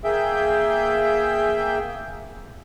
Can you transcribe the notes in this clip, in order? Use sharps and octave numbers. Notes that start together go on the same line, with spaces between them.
A#3 G#4 E5 G5 G6